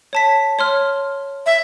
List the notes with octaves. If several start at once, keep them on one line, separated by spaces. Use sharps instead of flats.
C#5 A5 B6
C#5 C6 F6
E5